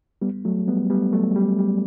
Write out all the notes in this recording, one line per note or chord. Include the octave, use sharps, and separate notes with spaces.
G3 B3
F#3 A3
G3 B3
G3 B3
F#3 A3
G3
G3